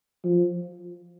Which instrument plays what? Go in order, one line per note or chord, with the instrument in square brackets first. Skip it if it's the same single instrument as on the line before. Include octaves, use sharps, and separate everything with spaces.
[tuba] F3